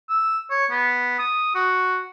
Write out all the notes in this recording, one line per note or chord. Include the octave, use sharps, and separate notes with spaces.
E6
C#5
B3
D#6
F#4